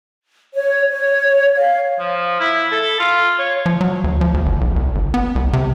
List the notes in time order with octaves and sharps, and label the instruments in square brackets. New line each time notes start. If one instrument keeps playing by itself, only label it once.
[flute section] C#5
C#5
F5
[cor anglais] F3
E4
A4
F4
C#5
[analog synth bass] F3
F#3
D2
F3
D2
G1
B1
C2
G1
B3
C2
C3